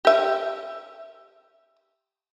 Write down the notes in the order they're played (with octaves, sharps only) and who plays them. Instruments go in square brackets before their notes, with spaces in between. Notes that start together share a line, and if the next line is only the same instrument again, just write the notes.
[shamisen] G4 E5